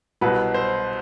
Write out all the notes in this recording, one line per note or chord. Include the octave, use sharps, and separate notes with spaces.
C2 B2 F#3 B4
C5